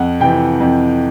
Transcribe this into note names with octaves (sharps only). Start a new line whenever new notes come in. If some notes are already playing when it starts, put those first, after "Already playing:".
Already playing: F2 F#5
C3 E3 G5
F2